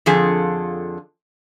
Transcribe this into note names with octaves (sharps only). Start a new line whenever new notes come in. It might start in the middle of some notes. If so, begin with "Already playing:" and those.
F2 D3 F3 G#4 A4